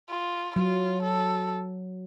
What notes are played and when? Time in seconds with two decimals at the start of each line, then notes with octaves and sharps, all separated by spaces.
0.10 F4
0.56 F#3 F4
1.03 A4